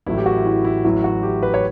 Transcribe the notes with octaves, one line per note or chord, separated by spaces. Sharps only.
A1 A2 F#3 A3 E4
G4
F#4
E4
E4
A1 A2 F#3
F#4
G4
B4
C#5